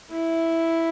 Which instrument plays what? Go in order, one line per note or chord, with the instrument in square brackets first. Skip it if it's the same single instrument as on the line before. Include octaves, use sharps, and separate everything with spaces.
[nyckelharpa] E4